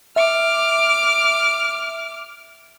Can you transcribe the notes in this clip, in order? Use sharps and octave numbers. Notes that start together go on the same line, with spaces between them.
E5 D6 F6